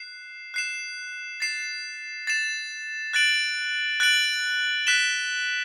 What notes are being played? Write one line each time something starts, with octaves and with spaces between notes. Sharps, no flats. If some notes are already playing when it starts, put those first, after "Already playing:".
Already playing: F#6 C7 E7
F#6 C7 E7
A6 C7 E7
A6 C7 E7
F#6 A6 D7 F#7
F#6 A6 D7 F#7
F#6 B6 E7 G7